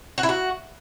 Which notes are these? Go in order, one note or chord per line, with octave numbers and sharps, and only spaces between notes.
F#4
E4
F#4